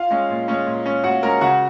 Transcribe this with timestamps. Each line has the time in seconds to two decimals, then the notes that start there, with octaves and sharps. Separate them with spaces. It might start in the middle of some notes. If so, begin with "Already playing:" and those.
Already playing: F4 F5
0.11 G#3 C#4
0.29 A#2
0.48 G#3 C#4
0.67 A#2
0.86 G#3 C#4
1.04 A#2 F#4 F#5
1.23 G#3 C#4 A#4 A#5
1.41 C#3 F#4 F#5